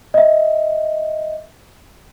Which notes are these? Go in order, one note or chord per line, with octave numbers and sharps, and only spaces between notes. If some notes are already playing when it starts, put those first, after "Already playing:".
D#5 E5